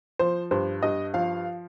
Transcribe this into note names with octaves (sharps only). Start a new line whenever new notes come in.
F3 C5
G2 C5
G2 D#5
F3 F5